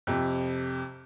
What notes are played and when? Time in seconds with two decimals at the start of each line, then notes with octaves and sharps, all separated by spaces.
0.07 F2 C3